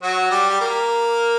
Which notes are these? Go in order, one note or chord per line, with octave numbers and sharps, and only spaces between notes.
F#3 F#4
G3 G4
G4
A#3 A#4